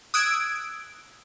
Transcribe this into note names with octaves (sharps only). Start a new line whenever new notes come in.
D#6 E6 F#6 G#6 D7